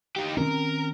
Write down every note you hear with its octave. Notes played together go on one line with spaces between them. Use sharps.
D#4 G4
D#3 C4 C#4 A#4